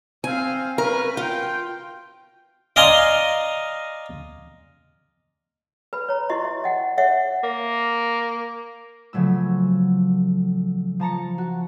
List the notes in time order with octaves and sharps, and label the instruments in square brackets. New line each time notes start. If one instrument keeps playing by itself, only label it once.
[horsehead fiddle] C4 F5 [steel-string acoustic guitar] G#5
[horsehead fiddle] C#4 B4 [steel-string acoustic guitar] A#4
[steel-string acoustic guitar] F4 [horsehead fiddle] G5
[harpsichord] D5 D#5 F5 G#5 A#5 C6
[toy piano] B4 B5
C#5 A#5
E4 F#4 D#5 C6 C#6
E5
D#5 F#5 G5
C#5 E5 F#5
[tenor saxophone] A#3
[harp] C#3 F3 F#3 A3 E6
F3 A5 A#5 C#7
F#4